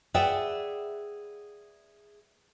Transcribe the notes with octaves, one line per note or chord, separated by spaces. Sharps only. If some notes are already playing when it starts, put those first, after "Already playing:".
G#4 B4 D5 E5 F#5 G5